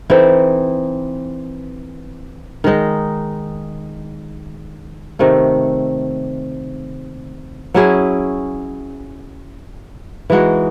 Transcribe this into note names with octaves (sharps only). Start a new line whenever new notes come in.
E3 C4 D#4 A4
D#3 G#3 D#4
C3 D#3 A3
F#3 C#4 E4 G#4
E3 G#3 D#4 F#4